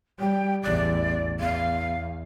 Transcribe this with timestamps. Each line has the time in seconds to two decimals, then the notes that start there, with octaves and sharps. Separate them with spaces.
0.19 G3 G5
0.63 A1 E2 D5
1.39 E2 F5